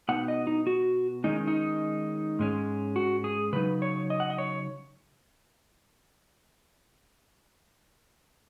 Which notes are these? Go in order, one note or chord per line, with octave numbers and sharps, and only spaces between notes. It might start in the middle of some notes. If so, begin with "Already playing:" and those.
B2 B3 D#4 F#5
D#5
D#4
F#4
D#3 G#3 C#4 D#4
D#4
G#2 G#3 C#4
F#4
G#4
C#3 F#3 D#4 B4
C#5
D#5
F#5
D#5
C#5